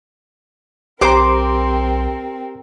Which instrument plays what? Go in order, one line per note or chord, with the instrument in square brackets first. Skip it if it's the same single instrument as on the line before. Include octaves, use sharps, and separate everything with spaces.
[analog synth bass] B1 [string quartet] C4 A#4 [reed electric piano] G4 A#5 [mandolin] C5 D6